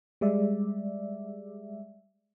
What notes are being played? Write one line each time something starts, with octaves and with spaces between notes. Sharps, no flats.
G3 G#3 D5 E5